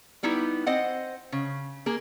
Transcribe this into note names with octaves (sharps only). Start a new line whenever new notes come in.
G3 B3 D#4 E4 G4
C4 C5 D#5 F#5
C#3
A#3 G#4